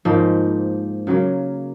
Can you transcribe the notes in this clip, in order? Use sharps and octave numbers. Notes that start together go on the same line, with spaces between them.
G#2 F3 A#3 D#4
C#3 F#3 A#3